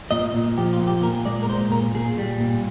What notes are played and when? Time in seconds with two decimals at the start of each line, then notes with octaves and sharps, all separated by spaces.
0.11 A#2 D#5
0.34 A#2
0.58 F3 G4
0.73 F4
0.80 A#2
0.87 G4
1.03 A#2 A#4
1.25 G#3 D5
1.42 A#4
1.48 A#2 C5
1.72 A#2 A#4
1.95 A#2 G#4
2.18 G3
2.41 A#2